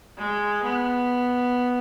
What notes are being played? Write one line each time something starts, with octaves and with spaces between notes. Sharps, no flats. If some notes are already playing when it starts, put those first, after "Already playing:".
G#3
B3